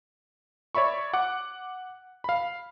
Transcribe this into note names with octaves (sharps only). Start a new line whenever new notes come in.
C#5 D5 E5 B5 C#6
F#5 D6 F#6
F5 B5